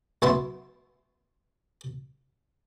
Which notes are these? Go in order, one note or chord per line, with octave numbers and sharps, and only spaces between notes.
F#2 B3 E4 C6